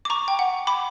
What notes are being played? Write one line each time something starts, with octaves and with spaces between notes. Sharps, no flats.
D6
A#5 C#6
G5
F#5
B5 D6